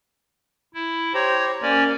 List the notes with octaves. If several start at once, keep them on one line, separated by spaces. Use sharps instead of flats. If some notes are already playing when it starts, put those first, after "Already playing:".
E4
G4 C5 C#5 A#5
A#3 C#4 D5